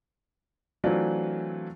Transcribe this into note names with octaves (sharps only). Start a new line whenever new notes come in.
E3 F#3 A3 C4 D4 F4